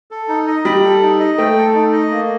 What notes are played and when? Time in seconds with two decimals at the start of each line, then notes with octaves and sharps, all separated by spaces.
0.11 A4
0.28 D#4
0.47 D#5
0.65 G3 G5
0.84 A4
1.02 D#4
1.20 D#5
1.38 A3 G5
1.57 A4
1.75 D#4
1.92 D#5
2.11 A#3